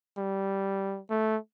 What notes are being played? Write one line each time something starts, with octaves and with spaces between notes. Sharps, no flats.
G3
A3